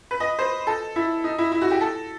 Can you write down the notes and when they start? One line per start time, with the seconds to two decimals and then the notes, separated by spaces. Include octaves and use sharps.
0.11 B4
0.20 D#5
0.39 C5
0.67 A4
0.96 E4
1.24 D#4
1.38 E4
1.52 E4
1.61 F#4
1.71 G4
1.81 A4